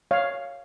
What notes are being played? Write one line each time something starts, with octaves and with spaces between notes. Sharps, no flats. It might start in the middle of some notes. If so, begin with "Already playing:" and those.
C#5 F5